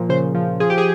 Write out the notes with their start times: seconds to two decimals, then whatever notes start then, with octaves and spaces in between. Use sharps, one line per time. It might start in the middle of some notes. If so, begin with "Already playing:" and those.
Already playing: A#2 F3
0.09 C#3 C5
0.35 F3
0.60 F3 G#4
0.70 G4
0.78 G#4